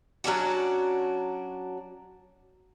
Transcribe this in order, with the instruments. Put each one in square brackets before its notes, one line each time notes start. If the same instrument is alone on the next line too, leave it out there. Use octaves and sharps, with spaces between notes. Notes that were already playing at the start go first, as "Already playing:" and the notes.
[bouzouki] F#3 C#4 D4 F#4